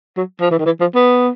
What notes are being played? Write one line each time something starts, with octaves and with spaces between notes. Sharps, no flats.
F#3
F3
E3
D#3
E3
F3
B3